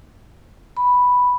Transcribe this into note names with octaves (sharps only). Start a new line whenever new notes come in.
B5